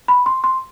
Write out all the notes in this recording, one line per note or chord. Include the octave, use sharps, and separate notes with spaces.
B5
C6
C6